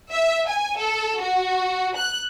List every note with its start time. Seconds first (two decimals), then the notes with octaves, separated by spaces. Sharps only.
0.12 E5
0.47 G#5
0.78 A4
1.21 F#4
1.96 F#6